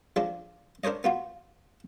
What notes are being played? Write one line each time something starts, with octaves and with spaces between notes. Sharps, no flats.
F3 G#3 D4
D4 A#4 C5 C#5 D#5
B3 F4 F#4